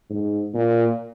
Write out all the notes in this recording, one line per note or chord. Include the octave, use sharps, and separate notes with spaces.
G#2
A#2